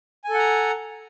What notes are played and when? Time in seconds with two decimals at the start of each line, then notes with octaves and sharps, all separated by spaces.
0.24 G#5
0.29 A4
0.34 F#5
0.39 A#5